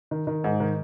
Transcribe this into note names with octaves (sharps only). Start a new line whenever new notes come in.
D#3
D#3
G#2
D#3